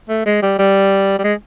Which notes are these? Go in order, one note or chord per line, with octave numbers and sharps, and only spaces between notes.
A3
G#3
G3
G3
G3
G#3